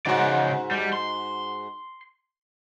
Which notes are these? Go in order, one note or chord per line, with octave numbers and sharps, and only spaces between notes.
G#2 C#3 F#4 D5
G3
C6